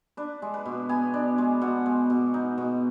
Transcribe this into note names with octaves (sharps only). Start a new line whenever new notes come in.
D4 B4
G#3
B4
B2
B3 G#5
D4
G#3
B2 F#5
G#3
B2
D#4
B2